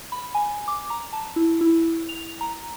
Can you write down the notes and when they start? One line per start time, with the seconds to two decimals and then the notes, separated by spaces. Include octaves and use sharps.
0.12 B5
0.34 G#5
0.68 D6
0.90 A#5
1.13 A5
1.36 E4
1.61 E4
2.09 F7
2.41 A#5